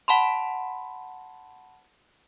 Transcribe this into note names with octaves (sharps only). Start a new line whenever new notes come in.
F#5 A5 B5 C6